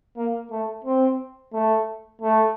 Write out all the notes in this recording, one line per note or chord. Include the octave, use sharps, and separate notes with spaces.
A#3
A3
C4
A3
A3